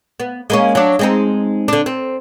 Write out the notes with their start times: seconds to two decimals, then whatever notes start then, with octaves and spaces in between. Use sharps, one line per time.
0.20 B3
0.50 G#3 A#3 C#4
0.75 F#3 D4
0.99 G#3 C4 D#4
1.68 D3 D4
1.86 C4